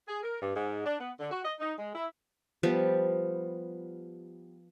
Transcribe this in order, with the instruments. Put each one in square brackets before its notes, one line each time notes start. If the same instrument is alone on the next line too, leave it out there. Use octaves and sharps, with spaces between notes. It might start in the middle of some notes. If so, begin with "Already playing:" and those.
[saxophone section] G#4
A#4
G2
G#2
D4
B3
D3
F#4
D#5
D#4
G#3
E4
[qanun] F3 G3 B3